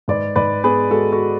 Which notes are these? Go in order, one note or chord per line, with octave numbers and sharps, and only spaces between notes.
G#2 B4 D5
G#2 B4 D5
B3 G#4 B4
G#3 F#4 A4
F#4 A4